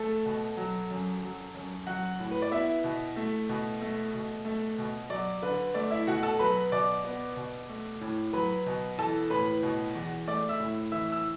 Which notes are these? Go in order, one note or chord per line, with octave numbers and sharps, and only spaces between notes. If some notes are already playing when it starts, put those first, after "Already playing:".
Already playing: A3 A4 A5
B2
F#3
F#2
F#3
F#2
F#3 F#4 F#5
A2
B4
D5
B3 E4 E5
B2
A3
B2
A3
B2
A3
B2
F#3 D5
D3 B4
A3 D5
E4 E5
B2 F#4 F#5
A4 A5
F#3 B4 B5
B2 D5 D6
B3
B2
A3
A2
F#3 B4 B5
B2
E3 A4 A5
A2 B4 B5
B2
E2
A3 D5 D6
E5 E6
A2
E3 E5 E6
E6